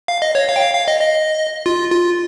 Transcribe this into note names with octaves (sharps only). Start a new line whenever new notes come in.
F5
D#5
C#5
F5
G5
F5
F5
D#5
D#5
F4
F4